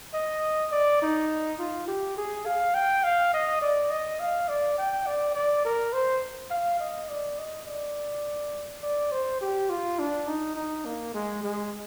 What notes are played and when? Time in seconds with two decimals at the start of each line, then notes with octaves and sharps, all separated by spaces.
0.14 D#5
0.72 D5
1.02 D#4
1.60 F4
1.88 G4
2.17 G#4
2.46 F5
2.74 G5
3.04 F5
3.34 D#5
3.62 D5
3.91 D#5
4.20 F5
4.49 D5
4.78 G5
5.07 D5
5.35 D5
5.65 A#4
5.93 C5
6.51 F5
6.80 D#5
7.09 D5
7.38 D#5
7.67 D5
8.83 D5
9.12 C5
9.41 G4
9.70 F4
9.99 D4
10.28 D#4
10.56 D#4
10.85 A#3
11.14 G#3
11.43 G#3